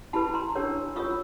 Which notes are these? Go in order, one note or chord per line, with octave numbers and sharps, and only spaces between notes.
E4 G4 B4 A5 B5
A#5 C6
D4 G4 A#4 C#5
F4 A#4 C#5 C#6 D#6